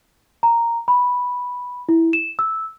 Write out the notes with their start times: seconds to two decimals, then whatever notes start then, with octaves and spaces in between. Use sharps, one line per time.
0.43 A#5
0.88 B5
1.89 E4
2.13 E7
2.39 E6